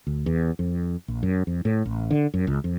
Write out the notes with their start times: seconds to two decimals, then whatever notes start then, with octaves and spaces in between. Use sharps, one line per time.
0.07 D2
0.26 E2
0.59 F2
1.08 A#1
1.23 F#2
1.47 F2
1.65 A2
1.85 A1
2.11 D3
2.34 F#2
2.47 C#2
2.64 F2